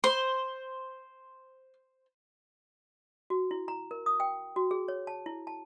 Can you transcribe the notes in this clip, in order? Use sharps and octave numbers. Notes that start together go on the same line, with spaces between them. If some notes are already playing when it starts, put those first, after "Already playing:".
C5 C6
F#4
E4
A#5
A#4
D#6
G5
F#4
G#4
C#5
A5
E4
A5